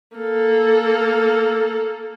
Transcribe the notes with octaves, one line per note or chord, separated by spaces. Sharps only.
A#3 A4